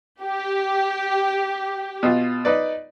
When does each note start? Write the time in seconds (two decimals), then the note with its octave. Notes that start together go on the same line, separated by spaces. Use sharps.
0.22 G4
2.03 B2 F4
2.45 D#4 B4 D5